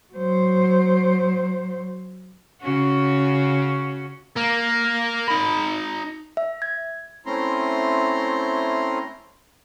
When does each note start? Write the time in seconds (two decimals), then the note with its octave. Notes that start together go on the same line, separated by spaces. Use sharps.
0.13 F#3 C5
2.61 C#3 C#4 F#4
4.36 A#3
5.28 D#4 B5
6.37 E5
6.62 G#6
7.26 A3 C4 C#4 E4 A#5 C6